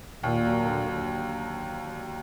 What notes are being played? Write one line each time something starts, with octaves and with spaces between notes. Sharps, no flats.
D#2 A#2
F#3
D3
D3